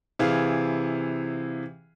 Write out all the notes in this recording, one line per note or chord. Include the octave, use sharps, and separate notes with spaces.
C3 E3 G#4 F5